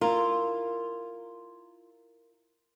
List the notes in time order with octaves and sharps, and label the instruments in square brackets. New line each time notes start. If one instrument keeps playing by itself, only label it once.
[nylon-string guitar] E4 A#4 [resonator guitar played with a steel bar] F4